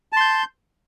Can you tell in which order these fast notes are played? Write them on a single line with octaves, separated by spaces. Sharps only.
A5 C6 G6